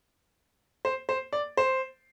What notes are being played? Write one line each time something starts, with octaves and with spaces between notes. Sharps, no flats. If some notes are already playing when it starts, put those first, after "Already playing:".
C5
C5
D5
C5